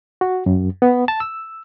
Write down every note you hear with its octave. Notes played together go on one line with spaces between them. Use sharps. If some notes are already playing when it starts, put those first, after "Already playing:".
F#4
F#2
B3
A5
E6